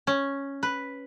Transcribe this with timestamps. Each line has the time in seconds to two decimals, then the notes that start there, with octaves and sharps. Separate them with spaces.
0.07 C#4
0.63 B4